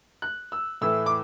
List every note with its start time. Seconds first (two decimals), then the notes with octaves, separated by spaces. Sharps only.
0.22 F#6
0.52 E6
0.81 A2 E3 A3 E6
1.06 D6